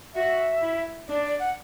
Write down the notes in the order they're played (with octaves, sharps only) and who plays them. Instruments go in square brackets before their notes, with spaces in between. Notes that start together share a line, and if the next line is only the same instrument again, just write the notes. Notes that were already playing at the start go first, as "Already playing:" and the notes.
[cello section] F#4 [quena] E5
[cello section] E4
[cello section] D4 [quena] D5
[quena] D5
F#5